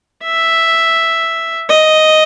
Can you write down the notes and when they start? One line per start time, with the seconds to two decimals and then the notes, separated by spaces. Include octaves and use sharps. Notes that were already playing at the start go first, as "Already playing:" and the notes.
0.24 E5
1.70 D#5